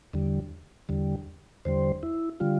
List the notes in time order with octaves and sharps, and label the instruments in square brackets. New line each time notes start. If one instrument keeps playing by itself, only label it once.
[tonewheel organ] E2 D3 G3
E2 D3 G3
E2 D3 G3 C5
E4
D3 G3 F4